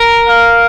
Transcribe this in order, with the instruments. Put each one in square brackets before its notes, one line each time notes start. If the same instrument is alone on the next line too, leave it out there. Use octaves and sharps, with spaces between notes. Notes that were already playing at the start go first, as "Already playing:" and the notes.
Already playing: [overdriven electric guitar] A#4
[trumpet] F5